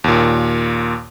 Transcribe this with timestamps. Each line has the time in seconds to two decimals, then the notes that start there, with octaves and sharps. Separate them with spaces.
0.04 D#2 A#2